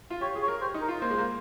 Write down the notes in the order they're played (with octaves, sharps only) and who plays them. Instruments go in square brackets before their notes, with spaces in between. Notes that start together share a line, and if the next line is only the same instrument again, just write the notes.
[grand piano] F4
[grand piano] G4 [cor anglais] C#5
[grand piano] G#4
[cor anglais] C#5
[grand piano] A#4
[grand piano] G4 [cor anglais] C5
[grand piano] D#4
[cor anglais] A#4
[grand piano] F4
[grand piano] A#3 [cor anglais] C5
[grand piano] G#3
A#3